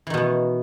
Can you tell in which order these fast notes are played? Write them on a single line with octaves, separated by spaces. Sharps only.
E3 D#3 B2 B3